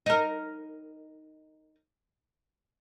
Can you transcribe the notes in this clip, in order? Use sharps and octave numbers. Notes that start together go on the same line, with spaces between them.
D#4 A#4